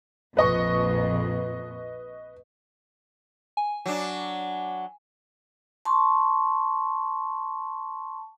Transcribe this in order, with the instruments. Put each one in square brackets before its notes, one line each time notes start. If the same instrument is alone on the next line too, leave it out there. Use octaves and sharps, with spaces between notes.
[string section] A#1 F2 [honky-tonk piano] B4 D#5 C#6
[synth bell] G#5
[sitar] F#3 D4
[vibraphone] A5 C6 C#6